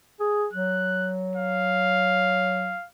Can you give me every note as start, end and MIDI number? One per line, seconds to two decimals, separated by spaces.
0.20 0.46 68
0.53 2.75 54
0.53 1.11 90
1.36 2.87 77